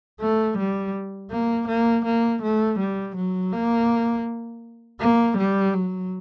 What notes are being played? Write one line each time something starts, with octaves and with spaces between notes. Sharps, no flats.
A3
G3
A#3
A#3
A#3
A3
G3
F#3
A#3
A#3
G3
F#3